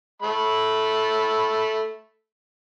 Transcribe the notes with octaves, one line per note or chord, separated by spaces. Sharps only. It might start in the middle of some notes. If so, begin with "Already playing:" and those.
A3 B5